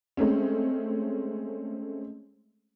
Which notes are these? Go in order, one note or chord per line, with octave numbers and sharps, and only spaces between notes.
G#3 A3 C4 C#4